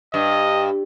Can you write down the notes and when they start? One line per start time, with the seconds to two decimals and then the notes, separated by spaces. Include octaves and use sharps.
0.14 G2 D#5